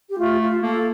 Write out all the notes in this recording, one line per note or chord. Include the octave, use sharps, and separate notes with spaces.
G4
A3 F4
F4
A#3 A4